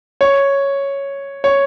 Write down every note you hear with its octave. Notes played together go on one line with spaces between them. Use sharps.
C#5
C#5